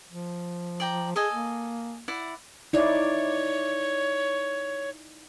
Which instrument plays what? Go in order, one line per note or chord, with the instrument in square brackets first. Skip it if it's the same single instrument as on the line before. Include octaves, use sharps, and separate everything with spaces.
[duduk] F3
[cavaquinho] D5 G5 A#5
[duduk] G#4 [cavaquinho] A4 D#5 G#5
[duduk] A#3
[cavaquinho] E4 D5 F#5
[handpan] D#4 E4 D5 [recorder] C#5